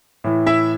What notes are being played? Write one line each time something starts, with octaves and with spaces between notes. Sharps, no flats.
A2 E3
E4 E5